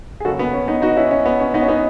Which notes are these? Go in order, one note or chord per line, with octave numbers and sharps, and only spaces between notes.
G#4
D#2 C#3 F#3 F#4 A4
B3
C#4
B3 D#4
D#4 F#4
C#4 E4
C#4
B3
C#4
B3 D#4
C#4
B3 D#4